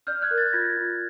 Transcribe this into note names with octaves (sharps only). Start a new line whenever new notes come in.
D5 F6 G6
F#6 G#6
A#4
G6 A6
F4 G#6 A#6
F4